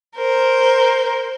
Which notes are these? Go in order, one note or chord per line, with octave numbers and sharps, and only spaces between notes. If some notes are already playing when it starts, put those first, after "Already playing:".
A#4 C5